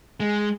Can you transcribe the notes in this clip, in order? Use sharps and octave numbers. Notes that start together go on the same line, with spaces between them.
G#3